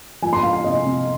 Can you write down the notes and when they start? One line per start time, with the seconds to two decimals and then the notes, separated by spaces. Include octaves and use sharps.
0.22 F3 G#5
0.33 C6
0.43 A#3 F5
0.53 F5
0.64 C3 D#5
0.85 C3